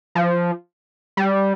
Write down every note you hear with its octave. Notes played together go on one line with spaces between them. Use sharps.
F3
G3